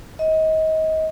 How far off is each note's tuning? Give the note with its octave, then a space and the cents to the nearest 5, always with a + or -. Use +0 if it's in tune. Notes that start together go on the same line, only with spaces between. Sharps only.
D#5 +30